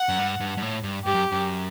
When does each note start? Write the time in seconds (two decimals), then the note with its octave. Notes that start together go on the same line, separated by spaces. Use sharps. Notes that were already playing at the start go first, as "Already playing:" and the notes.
Already playing: F#5
0.09 F#2
0.19 G2
0.40 G2
0.57 G2
0.62 A2
0.83 G2
1.05 G2 G4
1.14 F#2
1.32 F#2